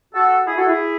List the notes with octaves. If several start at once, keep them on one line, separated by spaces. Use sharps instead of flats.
F#4 A4
E4 G#4
F#4 A4
E4 G#4